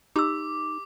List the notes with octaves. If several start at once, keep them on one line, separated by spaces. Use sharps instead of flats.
D#4 G4 C6 D6 E6